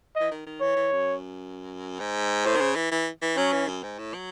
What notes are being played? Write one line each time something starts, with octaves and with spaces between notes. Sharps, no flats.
E3 D#5
D#3
D#3
E3 C#5
E3
F#2
G#2
A2 C5
D#3
C#3
E3
E3
E3
F#3 C#4
E3
F#2
G#2
A2
F#3